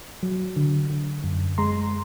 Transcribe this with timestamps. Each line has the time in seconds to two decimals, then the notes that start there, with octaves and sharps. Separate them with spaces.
0.23 F#3
0.56 D3
0.90 D3
1.24 F#2
1.58 G#3 A#5 C6